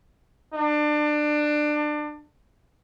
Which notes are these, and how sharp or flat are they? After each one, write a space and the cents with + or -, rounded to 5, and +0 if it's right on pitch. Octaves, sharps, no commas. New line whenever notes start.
D4 +25